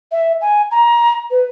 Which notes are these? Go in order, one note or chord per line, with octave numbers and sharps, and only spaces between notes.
E5
G#5
A#5
B4